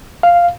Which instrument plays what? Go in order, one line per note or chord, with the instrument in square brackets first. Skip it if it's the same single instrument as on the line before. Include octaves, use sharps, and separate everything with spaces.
[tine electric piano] F5